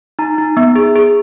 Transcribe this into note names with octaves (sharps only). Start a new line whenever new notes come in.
D#4 A#5
D#4
B3
G#4
G#4